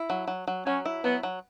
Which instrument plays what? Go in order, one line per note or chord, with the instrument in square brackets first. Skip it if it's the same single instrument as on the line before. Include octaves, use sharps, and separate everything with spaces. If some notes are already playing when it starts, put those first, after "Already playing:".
Already playing: [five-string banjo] E4
F#3
F#3
F#3
[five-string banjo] F#3 [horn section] C#4
[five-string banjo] E4
[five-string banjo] F#3 [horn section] B3
[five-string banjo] F#3